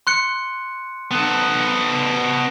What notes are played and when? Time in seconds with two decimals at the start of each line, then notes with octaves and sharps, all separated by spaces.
0.07 C6 F#6 C#7
1.11 B3 A4